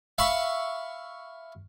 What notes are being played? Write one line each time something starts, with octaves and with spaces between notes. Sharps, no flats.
E5 F5 B5 C#6